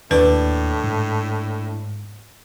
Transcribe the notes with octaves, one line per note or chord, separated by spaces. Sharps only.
D#2 A2 D4 B4
G#2